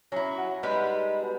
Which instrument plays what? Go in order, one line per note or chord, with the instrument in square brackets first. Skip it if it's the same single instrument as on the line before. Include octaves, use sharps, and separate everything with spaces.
[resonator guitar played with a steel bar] F#3 E4 [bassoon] C#4
[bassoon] F#4
[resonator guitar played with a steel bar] G3 G#3 B4 [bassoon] D#4
[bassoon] B2